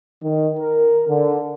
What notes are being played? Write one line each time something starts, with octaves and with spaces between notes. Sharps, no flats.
D#3
A#4
D3